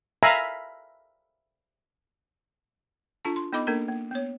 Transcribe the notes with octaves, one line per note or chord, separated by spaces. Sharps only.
E5 F5 G#5 A#5 B5
D4 F4 A4 A5
C6
B3 D#4 A4 D#5 B5 D6
A#3 D4 A4 A#4
A#3
B3 C#5